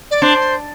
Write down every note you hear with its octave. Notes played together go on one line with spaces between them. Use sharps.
D5
D4 C5